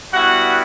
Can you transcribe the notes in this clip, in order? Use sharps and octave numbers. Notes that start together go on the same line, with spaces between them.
G3 B3 E4 F#4 F#5